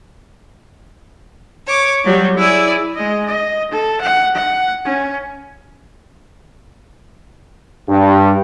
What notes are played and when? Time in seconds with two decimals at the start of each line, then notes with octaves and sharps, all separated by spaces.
1.67 C#5 D6
2.04 F#3 G3
2.36 E4 G#4 D5
2.95 G#3 D#5
3.26 D#5
3.71 A4
4.02 F#5
4.35 F#5
4.85 C#4
7.89 G2